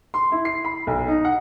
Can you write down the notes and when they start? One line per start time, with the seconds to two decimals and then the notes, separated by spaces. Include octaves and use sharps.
0.14 C6
0.32 E4
0.45 C7
0.64 B5
0.87 B1
1.08 D#4
1.25 F#5